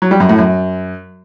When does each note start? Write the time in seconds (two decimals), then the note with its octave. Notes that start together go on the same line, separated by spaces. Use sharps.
0.02 F#3
0.11 G3
0.20 F#2
0.29 A2
0.38 F#2